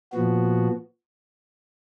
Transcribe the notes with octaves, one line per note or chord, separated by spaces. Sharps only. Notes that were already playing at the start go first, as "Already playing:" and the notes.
A#2 F3 B3 F#4